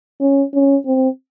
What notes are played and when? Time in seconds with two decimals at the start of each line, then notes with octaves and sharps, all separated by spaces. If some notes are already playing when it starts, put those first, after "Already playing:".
0.21 C#4
0.54 C#4
0.86 C4